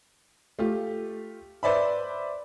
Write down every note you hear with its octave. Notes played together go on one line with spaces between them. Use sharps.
A3 F4 G4
B4 C5 D5 E5 B5